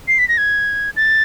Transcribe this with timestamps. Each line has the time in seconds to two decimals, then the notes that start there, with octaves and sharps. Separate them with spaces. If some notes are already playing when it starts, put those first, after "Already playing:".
0.08 C7
0.19 B6
0.29 A#6
0.38 G#6
0.96 A6